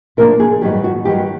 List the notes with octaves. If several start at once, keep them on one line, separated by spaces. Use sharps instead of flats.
C3 F3 A#3 D4 A#4
G#4
G2 D#3 F#3 G4
F#4
G2 D#3 F#3 G4